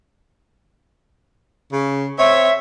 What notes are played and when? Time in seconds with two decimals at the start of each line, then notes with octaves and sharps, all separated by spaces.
1.72 C#3
2.19 C4 C#5 E5